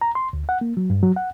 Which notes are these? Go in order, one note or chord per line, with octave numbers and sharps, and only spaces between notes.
A#5
C6
D2
F#5
A#3
F#3
G2
F#3
F#5